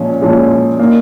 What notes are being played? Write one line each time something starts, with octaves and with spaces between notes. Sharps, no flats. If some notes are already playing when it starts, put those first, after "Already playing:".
Already playing: A#2 F3 G#3 C#4
A#2 F3 G#3 C#4
A#2 A#3 D#4